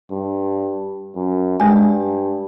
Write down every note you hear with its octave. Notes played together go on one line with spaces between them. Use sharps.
G2
F#2
G2 G#3 G#5